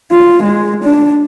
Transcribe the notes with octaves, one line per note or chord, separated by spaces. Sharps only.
F4
G#3
D4